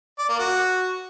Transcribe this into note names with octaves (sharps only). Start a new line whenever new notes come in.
D5
A#3
F#4